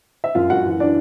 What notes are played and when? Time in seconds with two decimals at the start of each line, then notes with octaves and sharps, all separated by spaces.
0.24 E5
0.35 F#2 F4 F5
0.50 F#2 F#4 F#5
0.66 E3
0.80 E3 D4 D5